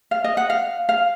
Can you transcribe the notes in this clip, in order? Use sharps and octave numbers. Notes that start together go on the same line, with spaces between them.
F5
D#5
F#5
F5
F5